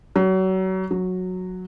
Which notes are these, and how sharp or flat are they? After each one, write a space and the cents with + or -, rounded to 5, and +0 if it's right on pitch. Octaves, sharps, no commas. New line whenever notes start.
F#3 +30
F#3 -10